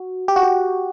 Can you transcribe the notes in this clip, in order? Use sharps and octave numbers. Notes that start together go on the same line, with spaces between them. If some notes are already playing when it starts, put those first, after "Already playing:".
Already playing: F#4
G4
F#4
G4